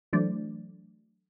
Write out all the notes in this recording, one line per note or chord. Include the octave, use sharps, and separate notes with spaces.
E3 F#3 A3 D4 C5 D5